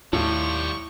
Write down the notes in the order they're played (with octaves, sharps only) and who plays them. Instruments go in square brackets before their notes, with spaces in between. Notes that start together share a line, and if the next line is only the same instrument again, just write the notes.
[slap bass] D#2 [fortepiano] A2 [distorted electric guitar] G3 F4 [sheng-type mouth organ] C#6